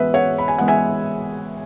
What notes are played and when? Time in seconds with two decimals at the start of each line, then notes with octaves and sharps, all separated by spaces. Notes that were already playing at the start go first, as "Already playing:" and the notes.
Already playing: E3 G#3 B3 B4 E5
0.14 C#5 F#5
0.38 B5
0.48 G#5
0.58 E3 G#3 B3 F#5
0.68 E5 G#5